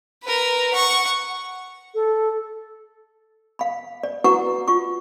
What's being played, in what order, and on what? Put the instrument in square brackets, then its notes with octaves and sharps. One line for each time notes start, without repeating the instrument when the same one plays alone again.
[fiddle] A#4 B4
F#5 C#6
[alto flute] A4
[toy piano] F5 B5
D5
E4 F#4 B4 F#5 A#5 C#6
F4 C#6